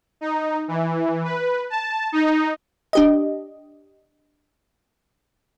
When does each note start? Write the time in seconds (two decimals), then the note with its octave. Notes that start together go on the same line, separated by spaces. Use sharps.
0.21 D#4
0.68 E3
1.24 B4
1.70 A5
2.12 D#4
2.93 D4 G4 D#5